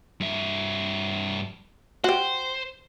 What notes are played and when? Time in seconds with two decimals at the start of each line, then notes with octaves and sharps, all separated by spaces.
0.20 G2 E5
2.04 F#4 G4 C5